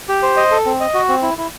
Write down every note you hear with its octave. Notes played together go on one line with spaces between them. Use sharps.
G4
C5
D#5
A4
C4
D#5
F#4
C4
E4
E4